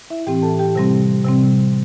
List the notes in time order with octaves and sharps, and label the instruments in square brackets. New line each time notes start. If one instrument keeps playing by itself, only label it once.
[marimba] E4 E5
A2 E3 C4 G4 G5
A4 A5
G4 G5
C3 G3 C4
C3 G3 C4